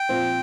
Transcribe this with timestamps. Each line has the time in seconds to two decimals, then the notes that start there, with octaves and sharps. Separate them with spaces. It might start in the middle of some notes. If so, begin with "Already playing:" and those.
Already playing: G5
0.09 A#2 F3 C4